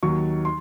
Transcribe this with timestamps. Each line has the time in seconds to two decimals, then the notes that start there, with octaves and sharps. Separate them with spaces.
0.03 D#2 D#3 F#3 C#6
0.45 C6